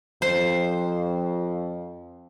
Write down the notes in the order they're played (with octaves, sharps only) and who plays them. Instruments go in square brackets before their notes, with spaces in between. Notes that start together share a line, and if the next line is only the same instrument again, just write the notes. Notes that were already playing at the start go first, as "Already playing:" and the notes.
[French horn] F2 [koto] C5